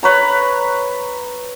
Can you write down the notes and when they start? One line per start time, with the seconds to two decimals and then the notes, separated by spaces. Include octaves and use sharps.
0.03 B4 C#5 A#5